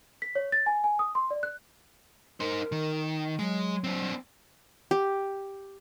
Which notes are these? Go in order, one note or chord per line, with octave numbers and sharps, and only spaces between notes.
B6
C#5
A6
G#5
G#5
D#6
C6
D5
F#6
D#4 A#4 C5
D#3
F#3 G#3
C4 D4
G4